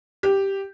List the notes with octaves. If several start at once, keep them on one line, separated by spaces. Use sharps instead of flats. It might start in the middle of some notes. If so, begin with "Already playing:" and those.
G4